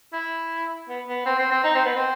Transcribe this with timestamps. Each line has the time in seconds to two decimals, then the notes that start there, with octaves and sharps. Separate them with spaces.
0.13 E4
0.89 B3
1.08 B3
1.26 C4
1.39 C4
1.51 C4
1.64 D#4
1.75 C4
1.85 B3
1.96 C4